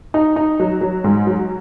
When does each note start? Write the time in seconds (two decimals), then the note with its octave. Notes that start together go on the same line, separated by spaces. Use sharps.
0.14 D#4
0.36 D#4
0.60 F#3
0.81 F#3
1.04 G#2
1.27 F#3